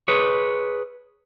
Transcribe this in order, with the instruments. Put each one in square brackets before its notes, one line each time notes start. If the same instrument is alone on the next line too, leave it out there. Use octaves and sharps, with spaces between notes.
[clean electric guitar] G#4 B4 C#5